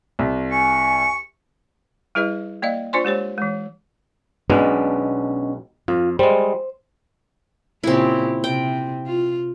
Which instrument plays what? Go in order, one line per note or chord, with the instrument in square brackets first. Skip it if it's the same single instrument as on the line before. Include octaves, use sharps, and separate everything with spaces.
[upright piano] C2
[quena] G#5 [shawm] C#6
[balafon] G3 E4 G#4 B4 D#5
A#3 D5 D#5 F5
D4 F4 C5 D5 G#5 C6
G#3 G4 C5 C#5
E3 G#3
[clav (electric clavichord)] B1 B2 G#3 [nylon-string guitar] B3 C#4 D4
[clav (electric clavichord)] F2 [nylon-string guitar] F4
[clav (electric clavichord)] G3 G#3 [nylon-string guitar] C5
[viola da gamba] A#2 C#3 G4 [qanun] C4 E4
[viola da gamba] C3 [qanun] G5
[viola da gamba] F4